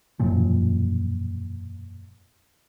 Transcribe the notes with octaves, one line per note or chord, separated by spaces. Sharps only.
E1 F#2 A#2 F3